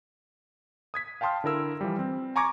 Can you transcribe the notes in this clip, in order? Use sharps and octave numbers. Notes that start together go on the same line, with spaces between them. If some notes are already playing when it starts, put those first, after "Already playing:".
D#6 G#6 B6
F5 G5 A5 C6 D#6 F6
D3 E4 A#4 E6
E3 F3 G3
C4
G#5 A#5 C#6 D6 G#6 A#6